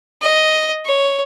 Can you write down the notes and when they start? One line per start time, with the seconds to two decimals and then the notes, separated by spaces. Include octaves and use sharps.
0.22 D#5
0.86 C#5